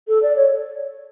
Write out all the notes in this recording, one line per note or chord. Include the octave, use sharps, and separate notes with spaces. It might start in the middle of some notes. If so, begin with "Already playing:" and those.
A4
D5
C#5